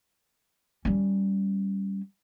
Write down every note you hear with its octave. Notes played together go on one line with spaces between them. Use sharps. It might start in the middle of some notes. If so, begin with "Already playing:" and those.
G3 C#4